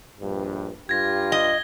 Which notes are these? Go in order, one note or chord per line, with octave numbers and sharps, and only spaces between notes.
A#1 G2
G2 F4 G4 G#6 A#6
D#5 G7